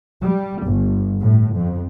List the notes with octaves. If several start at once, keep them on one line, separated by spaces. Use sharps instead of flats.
G3
G1
A2
F2